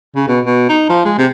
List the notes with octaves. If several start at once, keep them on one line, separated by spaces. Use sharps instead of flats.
C#3
B2
B2
D#4
F3
G#3
C3